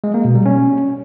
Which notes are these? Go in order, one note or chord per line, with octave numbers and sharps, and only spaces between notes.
G#3
A#3
B2
G3
C#4